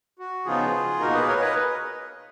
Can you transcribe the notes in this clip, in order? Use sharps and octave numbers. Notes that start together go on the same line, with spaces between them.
F#4
C#3 F3 B3 D#4 F4 G#4
B2 A#3 D#4 F#4 A#4
G#4 B4
A#4 C#5
B4 D#5